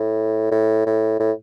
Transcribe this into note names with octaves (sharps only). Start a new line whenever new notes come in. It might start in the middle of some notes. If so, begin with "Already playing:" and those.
Already playing: A2
A2
A2
A2